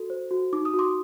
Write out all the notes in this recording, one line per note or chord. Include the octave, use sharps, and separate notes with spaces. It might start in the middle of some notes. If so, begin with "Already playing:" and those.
Already playing: F#4 A4
C5
F#4
D#4 D6
D#6
F#4
C6 D6